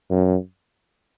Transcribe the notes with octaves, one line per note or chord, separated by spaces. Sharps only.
F#2